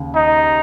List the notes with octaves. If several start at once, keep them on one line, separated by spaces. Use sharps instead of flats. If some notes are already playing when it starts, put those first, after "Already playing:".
Already playing: D#2 C#3
D#4